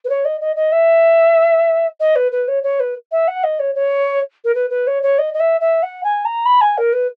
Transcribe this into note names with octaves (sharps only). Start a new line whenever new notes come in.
B4
C#5
D#5
D#5
D#5
E5
D#5
B4
B4
C#5
C#5
B4
E5
F#5
D#5
C#5
C#5
A#4
B4
B4
C#5
C#5
D#5
D#5
E5
E5
F#5
G#5
A#5
B5
G#5
A#4
B4